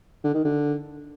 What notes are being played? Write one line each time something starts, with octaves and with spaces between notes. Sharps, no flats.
D3
D#3
D3